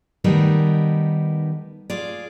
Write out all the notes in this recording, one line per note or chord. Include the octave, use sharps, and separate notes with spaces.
D#3 G3 A3 B3 D#4 A#4
F4 G#4 D5